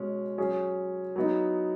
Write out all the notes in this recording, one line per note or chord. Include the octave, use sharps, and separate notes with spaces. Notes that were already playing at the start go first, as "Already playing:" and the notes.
Already playing: B2 G#3 C#4
F#3 C#4 G#4
F#3 B3 D#4